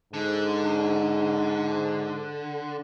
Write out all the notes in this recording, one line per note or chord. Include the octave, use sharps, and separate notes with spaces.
G#2 D3